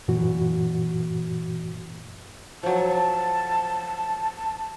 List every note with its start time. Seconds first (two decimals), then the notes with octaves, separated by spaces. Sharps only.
0.08 F#2 A#2 E3 F#4
2.63 F3 F#3 A5